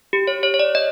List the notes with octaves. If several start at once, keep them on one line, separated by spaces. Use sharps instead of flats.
G4
C#5
C#5
C#5
D5
D#5